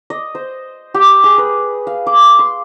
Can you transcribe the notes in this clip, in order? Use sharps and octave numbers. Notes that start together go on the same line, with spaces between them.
D#5
C5
G4
G#4
B4
F5
D6
C6